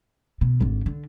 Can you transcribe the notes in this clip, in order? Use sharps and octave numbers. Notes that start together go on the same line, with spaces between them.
B2
G#1 D3
D3